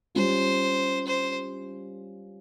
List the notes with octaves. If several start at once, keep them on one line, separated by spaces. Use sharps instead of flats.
G3 C#4 F4 C5
C5